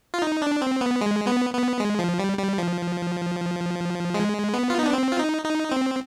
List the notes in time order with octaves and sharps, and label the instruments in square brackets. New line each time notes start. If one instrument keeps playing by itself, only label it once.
[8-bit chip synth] F4
D#4
D4
C4
B3
G#3
B3
B3
G#3
F3
G3
G3
F3
G#3
B3
F4
D#4
D4
C4
F4
D#4
D#4
C4